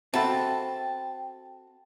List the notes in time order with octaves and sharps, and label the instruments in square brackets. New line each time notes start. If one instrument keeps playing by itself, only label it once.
[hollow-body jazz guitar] C4 F#4 A4 [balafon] E5 F#5 B5 [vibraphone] G5 [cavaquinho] A5